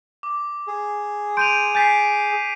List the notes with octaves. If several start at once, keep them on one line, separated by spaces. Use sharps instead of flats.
D6
G#4
C6 G6 D7 D#7 F7
G#5 G6 A6 B6 C7